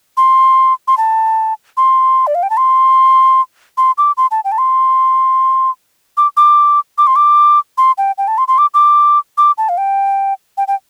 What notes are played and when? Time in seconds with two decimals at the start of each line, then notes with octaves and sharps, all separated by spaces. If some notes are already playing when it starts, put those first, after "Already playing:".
0.17 C6
0.88 C6
0.98 A5
1.77 C6
2.27 D5
2.35 F5
2.43 G5
2.50 A5
2.57 C6
3.78 C6
3.98 D6
4.17 C6
4.31 A5
4.45 G5
4.52 A5
4.58 C6
6.17 D6
6.37 D6
6.98 D6
7.07 C6
7.16 D6
7.78 C6
7.98 G5
8.18 G5
8.28 A5
8.38 C6
8.48 C6
8.58 D6
8.74 D6
9.38 D6
9.58 A5
9.69 F5
9.78 G5
10.58 G5
10.68 G5